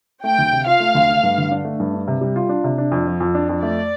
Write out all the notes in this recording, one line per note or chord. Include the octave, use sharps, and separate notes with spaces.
A3 G5
D2
C3
F4 F5
A3
D2
A3
G2
D3
D4
A3
G2
D4
C3
G3
F4
D4
C3
D4
F2
F3
F2
D4
F2
A3 D5